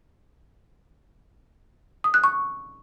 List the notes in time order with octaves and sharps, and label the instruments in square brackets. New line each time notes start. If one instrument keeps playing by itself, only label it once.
[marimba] D#6
F#6
C#6